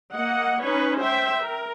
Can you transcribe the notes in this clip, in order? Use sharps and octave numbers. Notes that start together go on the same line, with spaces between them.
A#3 D#5 F#5
C#4 D#4 B4 C#5
C5 E5 G5
A#4